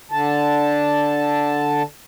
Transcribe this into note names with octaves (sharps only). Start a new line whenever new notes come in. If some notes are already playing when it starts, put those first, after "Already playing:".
D3 A5